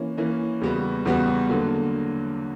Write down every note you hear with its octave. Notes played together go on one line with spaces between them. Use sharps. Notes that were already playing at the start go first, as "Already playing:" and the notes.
Already playing: E3 A#3 C#4
E3 A#3 C#4
E2 C#3 G3 B3 F#4
E2 C#3 G3 B3 F#4
D3 F#3 A#3